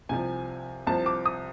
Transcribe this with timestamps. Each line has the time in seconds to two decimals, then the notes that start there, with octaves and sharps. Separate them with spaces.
0.09 C2 C3 F3 G#5
0.87 C2 C3 F3 A5
1.06 D6
1.26 D#6